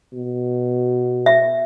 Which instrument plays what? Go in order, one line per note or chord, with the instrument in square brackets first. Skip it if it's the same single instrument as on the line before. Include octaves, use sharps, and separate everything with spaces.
[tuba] B2
[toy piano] E5